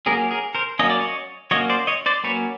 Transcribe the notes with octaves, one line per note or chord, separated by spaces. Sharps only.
F#3 A#3 C#4 G#4 A#4
G#4 A#4
A#4 C5
F#3 A#3 C#4 D#5
D5
C#5 D#5
F#3 A#3 C#4 C#5 D#5
C5 D5
C#5 D#5
C5 D5
F#3 A#3 C#4 B4 C#5